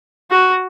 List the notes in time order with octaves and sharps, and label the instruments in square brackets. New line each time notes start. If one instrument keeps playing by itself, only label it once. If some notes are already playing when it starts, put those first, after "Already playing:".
[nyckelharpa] F#4